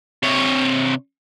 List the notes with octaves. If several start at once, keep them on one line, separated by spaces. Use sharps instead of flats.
C3 C#5